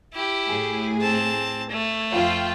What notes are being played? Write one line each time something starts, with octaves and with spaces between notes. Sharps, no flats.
E4 G4
A2 G#4
C4 A5
A3
F2 F4 G5